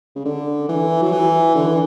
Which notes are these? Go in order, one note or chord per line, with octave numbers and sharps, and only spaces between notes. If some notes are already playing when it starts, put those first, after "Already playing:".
C#3
D3
E3
F#3
E3
D3
E3